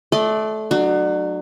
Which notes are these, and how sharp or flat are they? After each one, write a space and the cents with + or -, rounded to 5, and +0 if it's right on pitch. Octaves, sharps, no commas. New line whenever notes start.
A3 -20 D5 +10 C6 -35
F#3 +0 D4 +35